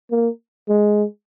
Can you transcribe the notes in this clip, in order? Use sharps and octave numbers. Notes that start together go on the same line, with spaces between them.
A#3
G#3